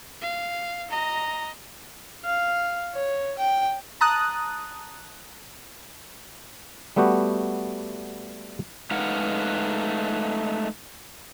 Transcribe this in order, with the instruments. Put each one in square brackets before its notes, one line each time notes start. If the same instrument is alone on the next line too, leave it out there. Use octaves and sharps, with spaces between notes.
[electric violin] F5
[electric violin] D#5 [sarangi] A#5
[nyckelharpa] F5
C#5
G5
[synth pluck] A5 A#5 D#6 F#6
[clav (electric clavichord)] G3 A3 B3 F#4 G4
[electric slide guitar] G#3 A3 D#4 B4 F5 F#5